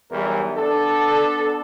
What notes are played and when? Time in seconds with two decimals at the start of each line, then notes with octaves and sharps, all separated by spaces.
0.11 B1 E2 E3 G3 A#4
0.57 B3 D4 A4